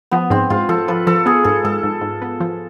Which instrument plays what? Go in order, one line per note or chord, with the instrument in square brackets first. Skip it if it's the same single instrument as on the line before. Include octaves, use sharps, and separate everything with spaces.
[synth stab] F3 [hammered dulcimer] B3
[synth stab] G#2 [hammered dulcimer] C4
[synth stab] G#2 [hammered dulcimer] F4
[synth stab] F3 [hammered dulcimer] A4
[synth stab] F3 [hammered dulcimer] B4
[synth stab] F3 [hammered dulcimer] A4
[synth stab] B3 [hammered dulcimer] G#4
[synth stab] G#2 [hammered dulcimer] A4
[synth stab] G#2 [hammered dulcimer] A4
[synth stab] G#2
G#2
B3
F3